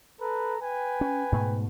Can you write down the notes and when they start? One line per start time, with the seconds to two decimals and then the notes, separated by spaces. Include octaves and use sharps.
0.20 A4 B4 A#5
0.61 B4 G5 G#5
1.01 C#4
1.32 G#2 B2 A3